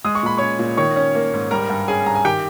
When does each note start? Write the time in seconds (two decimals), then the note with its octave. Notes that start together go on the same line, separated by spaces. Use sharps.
0.05 G#3 D#6
0.15 C#6
0.23 A#2 B5
0.38 C#4 C#5 C#6
0.59 A#2
0.77 D#3 C#5 C#6
0.96 C#4
1.15 A#3
1.34 G#2
1.51 G3 A#4 A#5
1.70 G2
1.88 C#4 G#4 G#5
2.06 G2 A#5
2.15 G#5
2.25 D#3 G4 G5